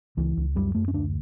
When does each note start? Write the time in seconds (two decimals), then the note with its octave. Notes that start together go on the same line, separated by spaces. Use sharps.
0.17 C#2 E3
0.37 C#2
0.55 F#2 G3
0.75 F#2 A3
0.88 C#4
0.94 D2 D4